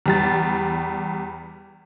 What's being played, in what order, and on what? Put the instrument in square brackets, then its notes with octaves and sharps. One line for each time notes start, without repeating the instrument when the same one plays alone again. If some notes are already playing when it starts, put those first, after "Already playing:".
[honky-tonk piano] E2 G3 A6